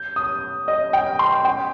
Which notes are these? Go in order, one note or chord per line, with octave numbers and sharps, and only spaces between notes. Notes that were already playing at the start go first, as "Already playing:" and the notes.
Already playing: G6
D#6
D#5
G5
C6
G5